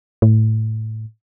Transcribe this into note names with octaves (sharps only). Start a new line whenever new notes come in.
A2